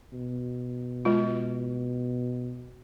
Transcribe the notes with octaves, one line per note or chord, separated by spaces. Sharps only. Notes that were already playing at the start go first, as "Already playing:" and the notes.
B2
G#3 F4